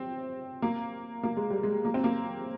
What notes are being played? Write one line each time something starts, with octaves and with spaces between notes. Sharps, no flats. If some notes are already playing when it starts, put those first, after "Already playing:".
Already playing: C4
A#3
A#3
G#3
G3
G#3
A#3
C4
A#3